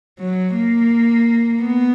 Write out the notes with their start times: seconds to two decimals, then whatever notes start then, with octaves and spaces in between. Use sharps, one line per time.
0.19 F#3
0.54 A#3
1.61 B3